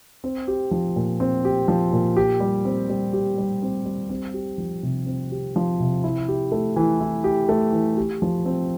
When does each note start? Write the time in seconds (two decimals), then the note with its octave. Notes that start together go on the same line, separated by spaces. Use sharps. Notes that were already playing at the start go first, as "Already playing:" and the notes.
0.24 C4
0.48 G4
0.71 F3
0.96 A#2
1.20 C4
1.45 G4
1.68 F3
1.93 A#2
2.17 G4
2.40 G3
2.65 C4
2.90 G3
3.13 G4
3.38 G3
3.62 C4
3.85 G3
4.10 C4
4.34 G4
4.58 F3
4.83 C3
5.06 C4
5.32 G4
5.56 F3
5.80 C3
6.04 E4
6.28 G4
6.52 A3
6.76 E3
7.00 E4
7.24 G4
7.49 A3
7.73 E3
7.97 G4
8.22 F3
8.45 C4